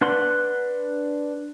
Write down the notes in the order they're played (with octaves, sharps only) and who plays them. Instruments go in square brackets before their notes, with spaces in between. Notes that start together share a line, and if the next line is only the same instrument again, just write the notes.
[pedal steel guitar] D4 B4 F#5 C6